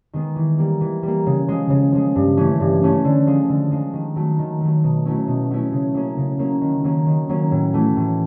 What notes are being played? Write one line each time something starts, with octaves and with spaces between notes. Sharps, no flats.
D#3 G#3 B3
E3
G3 A#3
E3
G3 A#3
C#3
F3 G#3
C#3
F3 G#3
G2
E3 A3 C#4
G2
E3 A3 C#4
D3
F3 G#3
D3
F3 G#3
D#3
F#3 A3
D#3
F#3 A3
B2
F#3 A3 C#4 E4
B2
F#3 A3 C#4 E4
C#3
F#3 A#3 C#4
C#3
F#3 A#3 C#4
D#3
F#3 A#3 C#4
D#3
F#3 A#3 C#4
A2
E3 A3
A2